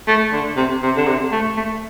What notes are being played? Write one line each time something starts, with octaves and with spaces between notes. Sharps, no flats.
A3
D3
C3
C3
D3
C3
A3
A3